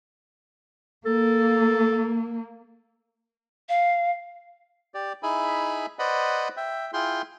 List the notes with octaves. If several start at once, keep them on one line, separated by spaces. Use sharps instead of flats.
A#3 A4
F5
G4 D5
D#4 E4 G#4 E5 G#5 B5
B4 C5 D5 D#5 F#5 B5
E5 G5
E4 F4 G#4 G5 C6